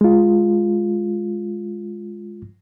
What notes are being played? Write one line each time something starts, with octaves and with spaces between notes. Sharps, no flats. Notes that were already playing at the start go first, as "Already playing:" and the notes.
G#3 F4